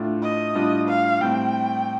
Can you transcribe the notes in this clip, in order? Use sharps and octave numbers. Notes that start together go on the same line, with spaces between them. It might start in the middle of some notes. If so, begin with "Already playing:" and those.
Already playing: A2 A3 D4 F4
D#5
A2 G3 D4 F4
F5
A2 G3 C4 G5